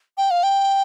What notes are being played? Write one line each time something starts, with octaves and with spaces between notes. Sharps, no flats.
G5
F5
G5